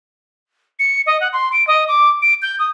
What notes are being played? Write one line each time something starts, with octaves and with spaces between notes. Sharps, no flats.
C#7
D#5
F#5
C6
D7
D#5
D6
D7
G6
D#6